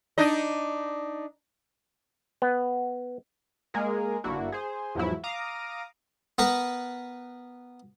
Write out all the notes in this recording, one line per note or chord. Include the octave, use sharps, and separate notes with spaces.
D4 D#4 D#5
B3
G#3 A#3 G#4 A#4
G1 A#3 D4 E4 F#4
G#4 C5
E2 G#2 F3 F#3 E4
F5 A#5 D6 D#6
B3 A#4 B4